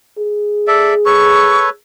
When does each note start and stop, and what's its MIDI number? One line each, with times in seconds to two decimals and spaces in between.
0.18 1.75 68
0.68 0.94 69
0.68 0.94 74
0.68 0.94 76
1.06 1.69 69
1.06 1.69 71
1.06 1.69 73
1.06 1.68 85